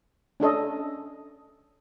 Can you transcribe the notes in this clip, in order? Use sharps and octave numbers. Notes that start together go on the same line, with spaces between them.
C#4 D4 A4 D#5